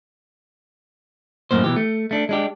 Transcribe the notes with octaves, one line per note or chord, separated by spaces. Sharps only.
F#2 A2 A#3 C5
B2 E3 G4
A3
A3 D4
G#3 D4 G4